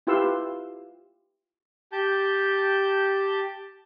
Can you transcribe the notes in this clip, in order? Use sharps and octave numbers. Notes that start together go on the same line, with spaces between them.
E4 F4 G4 B4 C6 E6
G4 A5 G6